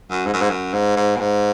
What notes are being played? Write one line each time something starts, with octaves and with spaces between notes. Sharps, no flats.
F#2
G#2
F#2
G#2
F#2
G#2
G#2
B2
G#2